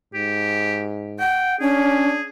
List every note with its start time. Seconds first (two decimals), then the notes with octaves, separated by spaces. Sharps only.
0.14 G#2 G4
1.20 F#5 G5
1.61 C#4 D4 G#4